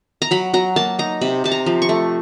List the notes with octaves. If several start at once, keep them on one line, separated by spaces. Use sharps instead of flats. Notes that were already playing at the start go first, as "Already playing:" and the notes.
A#5
F#3 B5
F#3 A#5
A#3 A5
D#4 A#5
C3 B5
C3 A5
A#5
F3
C#6
A3